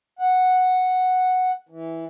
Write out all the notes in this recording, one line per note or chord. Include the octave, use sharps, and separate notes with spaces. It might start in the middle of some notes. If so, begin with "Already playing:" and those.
F#5
E3